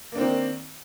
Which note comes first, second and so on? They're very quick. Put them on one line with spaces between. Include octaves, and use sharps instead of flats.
A#3 D4 C4 D#3